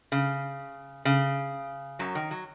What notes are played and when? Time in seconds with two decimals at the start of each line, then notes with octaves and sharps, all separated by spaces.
0.12 C#3
1.05 C#3
1.99 F#2 F#3
2.15 D#3
2.31 F#3